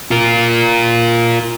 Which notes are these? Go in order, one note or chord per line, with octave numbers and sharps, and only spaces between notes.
F4 A#4